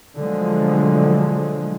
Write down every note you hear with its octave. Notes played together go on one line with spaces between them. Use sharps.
B2 D3 F3 F#3 G#3 A3